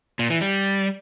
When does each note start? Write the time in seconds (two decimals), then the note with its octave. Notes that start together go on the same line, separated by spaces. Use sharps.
0.19 A#2
0.30 E3
0.41 G3